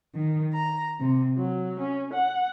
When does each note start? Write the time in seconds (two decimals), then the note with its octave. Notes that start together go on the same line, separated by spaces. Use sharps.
0.15 D#3
0.53 A#5
1.00 C3
1.36 F#3
1.79 C#4
2.13 F#5